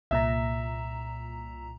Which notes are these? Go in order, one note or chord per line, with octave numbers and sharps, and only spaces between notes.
C2 A#2 E5 A#5